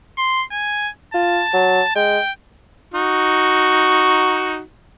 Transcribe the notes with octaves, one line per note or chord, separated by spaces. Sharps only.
C6
G#5
F4 A5
F#3
G#3 G5
D#4 F#4